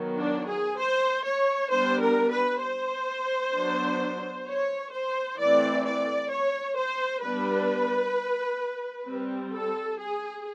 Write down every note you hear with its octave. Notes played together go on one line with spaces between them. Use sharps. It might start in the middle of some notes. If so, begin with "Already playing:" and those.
Already playing: D#3 F#3 B3
D4
G#4
C5
C#5
G3 B3 D4 C5
A#4
B4
C5
F#3 B3 D4
C#5
C5
E3 A3 C4 D5
D5
C#5
C5
G3 B3 D4 B4
G3 C4
A4
G#4